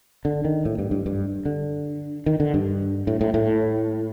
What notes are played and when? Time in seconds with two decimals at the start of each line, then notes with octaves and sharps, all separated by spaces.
0.25 D3
0.45 D#3
0.65 A2
0.79 G2
0.91 G2
1.06 G2
1.45 D3
2.26 D#3
2.40 D3
2.54 G2
3.07 A2
3.21 A2
3.34 A2